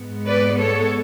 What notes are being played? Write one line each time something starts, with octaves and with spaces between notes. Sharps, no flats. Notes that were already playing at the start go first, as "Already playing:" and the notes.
Already playing: G#2 G#3 B3
B4 D5
A4 C#5